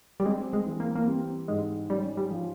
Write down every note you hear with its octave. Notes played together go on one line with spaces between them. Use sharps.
G3
G#3 C4
G#3
E3
A#3
A#3
G3 C4
G#2 G#3
G3 C#4
G3
F3